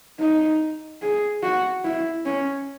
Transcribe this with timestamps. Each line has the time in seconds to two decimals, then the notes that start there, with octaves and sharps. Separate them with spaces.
0.20 D#4
1.02 G#4
1.43 F#4
1.84 E4
2.26 C#4